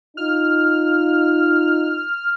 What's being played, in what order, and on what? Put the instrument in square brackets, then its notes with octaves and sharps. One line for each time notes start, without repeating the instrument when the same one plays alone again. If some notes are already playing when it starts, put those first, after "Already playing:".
[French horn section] D#4 F4 [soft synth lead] F6